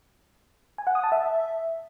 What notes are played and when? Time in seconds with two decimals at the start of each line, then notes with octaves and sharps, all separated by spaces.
0.78 G#5
0.87 F#5
0.95 D#6
1.04 A5
1.12 E5